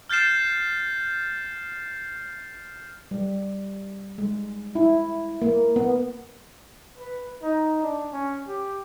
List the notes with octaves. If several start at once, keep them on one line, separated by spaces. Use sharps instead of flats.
F6 G6 A6 C7 E7
G3
G#3
E4
A#3
B3
B4
D#4
D4
C#4
G4